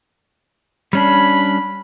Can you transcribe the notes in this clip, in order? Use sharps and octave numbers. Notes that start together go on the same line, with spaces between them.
G3 C#4 D4 B5